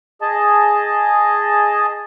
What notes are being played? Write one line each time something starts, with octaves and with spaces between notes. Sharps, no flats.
G#4 D#5 A5